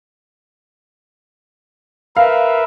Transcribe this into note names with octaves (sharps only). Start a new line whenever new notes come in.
A#4 B4 E5 F5